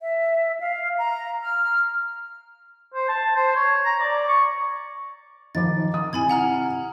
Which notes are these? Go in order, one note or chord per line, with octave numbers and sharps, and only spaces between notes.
E5
F5
A#5
F6
C5
A5
C5
C#5
A#5
D5
C#6
D#3 F3 D6 A6
D#6
C3 E4 G#5 B5 G#6
F#5 A#5 F6